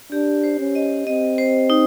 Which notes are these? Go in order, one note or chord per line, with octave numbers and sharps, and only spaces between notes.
D4 G4
C5
C#4
D#5
C4 D#5
C5
D#4